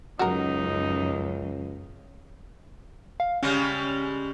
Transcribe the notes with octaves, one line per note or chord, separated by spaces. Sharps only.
C#2 F#2 D#4 F#4 A#4
F5
C#3 G3 G#3 C#4